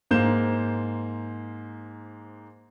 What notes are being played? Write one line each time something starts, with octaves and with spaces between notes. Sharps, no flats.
G#2 A#3 C5 G6 E7